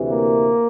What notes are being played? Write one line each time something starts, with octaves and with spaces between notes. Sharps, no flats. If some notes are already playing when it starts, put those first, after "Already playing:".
Already playing: D2 C3 E3
A#3